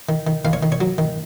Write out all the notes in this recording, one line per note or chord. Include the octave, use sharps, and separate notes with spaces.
D#3
D#3
D#3 F5
C#5
D#3
C#5
F#3
D#3